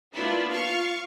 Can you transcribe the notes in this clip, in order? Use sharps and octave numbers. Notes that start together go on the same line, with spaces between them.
A#3 B3 D4 E4 F4
F4 F5 C#6